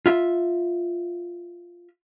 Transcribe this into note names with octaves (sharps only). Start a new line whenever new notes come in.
F4 E5